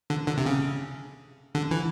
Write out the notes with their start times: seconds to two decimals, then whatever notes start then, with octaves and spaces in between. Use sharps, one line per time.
0.10 D3
0.27 D3
0.38 C3
0.46 C#3
1.55 D3
1.71 E3